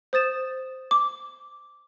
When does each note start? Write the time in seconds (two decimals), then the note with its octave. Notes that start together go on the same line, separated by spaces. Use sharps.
0.13 C5 D#6 A6 E7
0.91 D6